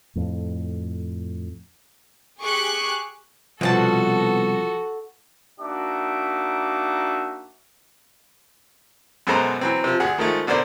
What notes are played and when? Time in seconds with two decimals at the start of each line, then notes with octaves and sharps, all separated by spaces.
0.16 F2 A2
2.42 G4 G#4 C#6 D6 F#6
3.61 C2 B2 F3 F#4 A4 F#5 A5
5.61 A#3 D4 D#4 F#4 E5 D6
9.27 F#2 B2 G#3 A4 C5 A#5
9.61 E3 F#3 C4
9.84 C3 F3
10.00 D2 G#4 F#5
10.18 D#3 F3 G#3 A3
10.47 B2 D3 A#4 C5 D5